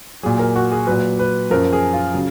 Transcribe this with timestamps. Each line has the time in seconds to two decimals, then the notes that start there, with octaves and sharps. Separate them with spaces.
0.23 A#2 F#3 G#4
0.39 A#4
0.56 F#4
0.72 G#4
0.87 A#2 F#3 B4
1.19 B4
1.50 F#2 F3 A#4
1.73 G#4
1.93 F4
2.14 C#3 F#3